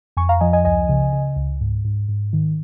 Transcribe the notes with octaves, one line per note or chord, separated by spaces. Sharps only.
F2 G#5 C#6
F5 A#5
F3 D#5 G#5
D#5 G#5
C#2 D#5 G#5
C#3
C#3
C#2
G#2
G#2
G#2
D#3